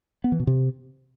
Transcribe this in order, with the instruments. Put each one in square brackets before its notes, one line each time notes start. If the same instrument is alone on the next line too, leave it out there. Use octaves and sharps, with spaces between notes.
[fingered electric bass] B3
E3
B2
C3